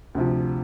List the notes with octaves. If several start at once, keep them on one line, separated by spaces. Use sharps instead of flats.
D2 C3 F3